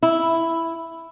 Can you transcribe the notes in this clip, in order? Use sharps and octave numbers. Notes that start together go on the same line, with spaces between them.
E4